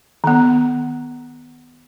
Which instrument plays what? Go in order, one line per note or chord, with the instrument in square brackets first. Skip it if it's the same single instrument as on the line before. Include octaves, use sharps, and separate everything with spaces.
[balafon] D#3 B3